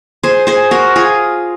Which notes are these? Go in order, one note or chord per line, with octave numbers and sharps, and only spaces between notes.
G#4 C5
G#4 C5
F#4 A#4
F4 G#4